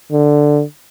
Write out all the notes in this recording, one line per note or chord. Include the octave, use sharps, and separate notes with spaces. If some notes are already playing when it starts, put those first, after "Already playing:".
D3